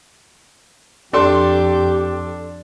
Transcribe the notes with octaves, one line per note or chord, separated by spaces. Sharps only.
F2 D4 G4 A4 D5 C6